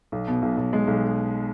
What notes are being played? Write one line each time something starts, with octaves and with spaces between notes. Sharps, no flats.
B1
B2
B1
B1
G#3
B1